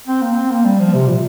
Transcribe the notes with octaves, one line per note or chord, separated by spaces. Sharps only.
C4
A#3
C4
A#3
G3
F3
C3
A#2